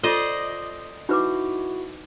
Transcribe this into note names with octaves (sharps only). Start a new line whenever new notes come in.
F4 A4 C5 D5 D#5
D#4 E4 F#4 B4 D6